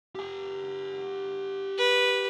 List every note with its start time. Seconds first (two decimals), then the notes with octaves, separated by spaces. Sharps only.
0.15 G4 G#5
1.79 B4